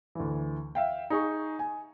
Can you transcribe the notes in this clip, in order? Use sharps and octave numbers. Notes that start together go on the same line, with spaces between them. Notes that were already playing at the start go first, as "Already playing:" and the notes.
D2 E3
E5 F5 G5
D#4 G#4 C#6
G#5